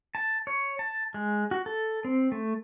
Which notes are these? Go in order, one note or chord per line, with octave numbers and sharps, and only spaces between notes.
A5
C#5
A5
G#3
F#4
A4
C4
A3